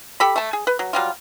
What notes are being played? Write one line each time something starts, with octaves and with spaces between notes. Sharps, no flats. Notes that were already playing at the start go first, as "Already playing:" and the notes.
G4 A4 B5
A3 A5
G#4
B4
F#3
F#3 G3 F4